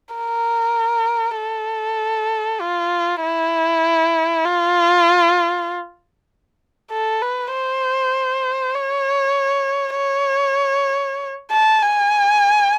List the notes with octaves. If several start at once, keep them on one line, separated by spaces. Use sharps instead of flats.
A#4
A4
F4
E4
F4
A4
B4
C5
C#5
C#5
A5
G#5